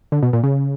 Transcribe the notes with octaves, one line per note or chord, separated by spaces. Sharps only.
D3
B2
A#2
C#3